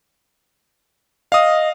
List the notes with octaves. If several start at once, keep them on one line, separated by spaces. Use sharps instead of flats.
D#5 F5 D#6